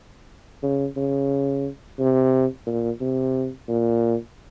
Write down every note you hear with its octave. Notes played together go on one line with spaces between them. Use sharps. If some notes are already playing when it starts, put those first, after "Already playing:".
C#3
C#3
C3
A#2
C3
A#2